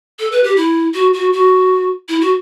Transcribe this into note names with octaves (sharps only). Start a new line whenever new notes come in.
A4
B4
G4
E4
F#4
F#4
F#4
E4
F#4